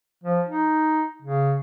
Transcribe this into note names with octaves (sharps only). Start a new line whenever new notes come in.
F3
D#4
C#3